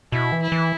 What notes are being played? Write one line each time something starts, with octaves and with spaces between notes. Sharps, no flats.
B2 E4
E3
E4
E3